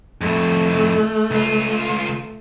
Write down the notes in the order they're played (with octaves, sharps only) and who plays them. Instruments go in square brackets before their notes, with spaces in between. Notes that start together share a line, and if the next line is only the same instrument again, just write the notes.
[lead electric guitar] F2 A2 [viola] A3
[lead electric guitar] C#2 F4